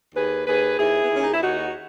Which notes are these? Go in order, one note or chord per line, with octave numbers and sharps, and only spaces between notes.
D#2 G#4 B4
D#2 G#4 B4
D#2 E4 G#4
B3
D#2 C#4
D#4
E4
D#2 D#4 F#4